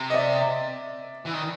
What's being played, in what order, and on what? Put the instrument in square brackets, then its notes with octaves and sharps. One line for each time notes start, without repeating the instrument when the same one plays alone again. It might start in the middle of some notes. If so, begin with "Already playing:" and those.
Already playing: [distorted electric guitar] C3
[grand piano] D#5
D5 E5
[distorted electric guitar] E3
D#3